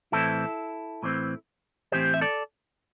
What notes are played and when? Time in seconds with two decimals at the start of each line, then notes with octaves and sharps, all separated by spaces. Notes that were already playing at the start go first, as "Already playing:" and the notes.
0.12 A2 E3 C4 E4 A4
1.03 A2 E3 C4
1.92 A2 E3 C4 G4 C5
2.14 E5
2.21 A4 D5